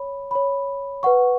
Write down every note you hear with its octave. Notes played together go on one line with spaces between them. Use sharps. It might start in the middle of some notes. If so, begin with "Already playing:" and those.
Already playing: C#5 B5
C#5 B5
B4 F#5 C#6